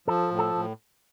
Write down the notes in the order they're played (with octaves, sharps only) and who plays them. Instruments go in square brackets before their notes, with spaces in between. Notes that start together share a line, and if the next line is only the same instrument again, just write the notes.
[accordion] F3 [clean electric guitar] A4
[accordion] A2
[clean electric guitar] A4
[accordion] A2